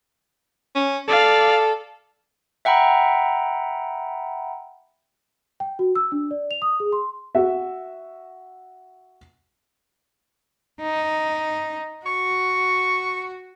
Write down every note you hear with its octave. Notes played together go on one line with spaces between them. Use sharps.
C#4
A4 D5 F5
E5 F#5 G5 A#5 B5
G5
F#4
E6
D4
D5
F7
D#6
G#4
C6
F#4 E5
D#4
F#4 C#6